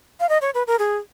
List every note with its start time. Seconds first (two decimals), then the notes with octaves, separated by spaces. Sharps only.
0.20 F5
0.29 D#5
0.41 C#5
0.54 B4
0.67 A#4
0.79 G#4